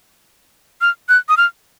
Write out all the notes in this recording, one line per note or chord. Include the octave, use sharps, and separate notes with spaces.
F6
F#6
D#6
F6